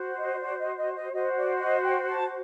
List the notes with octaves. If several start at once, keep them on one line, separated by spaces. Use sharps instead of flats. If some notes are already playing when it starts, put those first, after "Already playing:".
Already playing: F#4 C5
D#5
D5
D#5
D#5
D#5
F#4 C5 D#5
D5
D#5
G5
A5